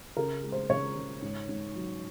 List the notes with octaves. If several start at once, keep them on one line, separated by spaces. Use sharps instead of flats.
C#3 A#4
G#3
C5
C#3 C#5
C#3
G#2
G#2
F#3